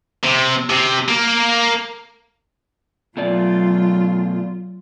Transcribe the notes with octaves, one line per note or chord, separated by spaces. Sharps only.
C3
C3
A#3
B2 F#3 A3 F4 D5